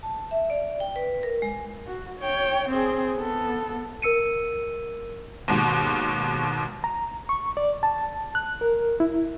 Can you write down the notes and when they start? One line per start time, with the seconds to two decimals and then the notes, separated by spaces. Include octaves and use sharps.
0.03 A5
0.31 E5
0.50 D5
0.80 G5
0.96 B4
1.23 A#4
1.42 G#3
1.86 F#4
2.19 C#5 G5
2.69 C4 G#4
3.15 B3 A4
4.02 A#4 E6 C#7 D#7
5.48 D#2 G#2 B2
6.84 A#5
7.29 C#6
7.57 D5
7.83 A5
8.35 F#6
8.61 A#4
9.00 E4